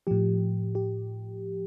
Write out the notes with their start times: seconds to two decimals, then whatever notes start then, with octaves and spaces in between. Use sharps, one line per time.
0.07 A2 F3 G4
0.75 G4